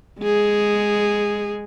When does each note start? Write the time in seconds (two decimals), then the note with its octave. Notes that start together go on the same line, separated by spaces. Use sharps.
0.20 G#3 G#4